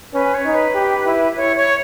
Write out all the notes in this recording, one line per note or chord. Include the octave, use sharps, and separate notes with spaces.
C#4 B4
C#5
D#4
B4
G4
E4
E4 C#5
C#5